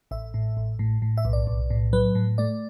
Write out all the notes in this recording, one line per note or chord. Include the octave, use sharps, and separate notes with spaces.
A1 E5
A2
A1
A2
A2
E5
B1
D5
B1
A2
F#3 B4
A2
A3 D5